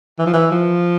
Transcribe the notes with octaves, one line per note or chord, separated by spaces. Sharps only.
E3
F3
E3
F3